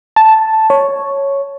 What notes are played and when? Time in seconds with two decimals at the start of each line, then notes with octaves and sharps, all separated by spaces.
0.16 A5
0.70 C#5